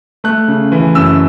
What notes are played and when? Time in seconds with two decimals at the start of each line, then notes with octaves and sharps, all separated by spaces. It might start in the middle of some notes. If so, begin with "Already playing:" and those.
0.24 A3 F#6
0.48 C#3
0.72 E3
0.95 F#2 E6